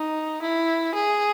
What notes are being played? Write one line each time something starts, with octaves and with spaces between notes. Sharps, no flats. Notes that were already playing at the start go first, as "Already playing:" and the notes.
Already playing: D#4
E4
G#4